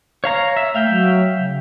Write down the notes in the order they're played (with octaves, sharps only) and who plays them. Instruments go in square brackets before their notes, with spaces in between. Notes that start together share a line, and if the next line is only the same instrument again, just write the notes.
[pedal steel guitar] C#5 F5 A#5
E5
[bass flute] A3 [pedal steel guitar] E5 F5 G5
[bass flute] F#3
C#3